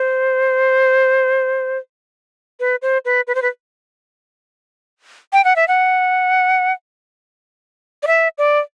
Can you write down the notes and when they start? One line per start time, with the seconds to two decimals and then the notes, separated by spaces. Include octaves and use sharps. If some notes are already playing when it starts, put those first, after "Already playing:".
Already playing: C5
2.60 B4
2.82 C5
3.05 B4
3.27 B4
3.35 C5
3.42 B4
5.33 G5
5.45 F#5
5.56 E5
5.68 F#5
8.03 D5
8.07 E5
8.38 D5